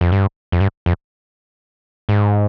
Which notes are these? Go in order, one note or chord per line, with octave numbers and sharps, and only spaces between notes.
F2
G2
F2
G2
F2
G#2